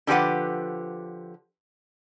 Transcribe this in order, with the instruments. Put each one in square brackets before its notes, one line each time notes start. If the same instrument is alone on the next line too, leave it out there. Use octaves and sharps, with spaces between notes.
[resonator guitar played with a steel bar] D3 F3 G4 B4 F#5